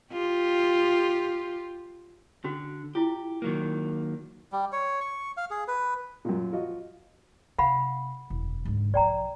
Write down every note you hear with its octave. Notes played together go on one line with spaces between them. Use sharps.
F4 G4
D3 C#4 F#4
E4 F4 G4
D#3 F#3 A#3
G3
C#5
C#6
F5
G#4
B4
F#2 A#2
F3 F4 F#4 D#5
C3 F5 F#5 B5
E1 F#2
G#2 D3
B1 F3 D5 G5 A#5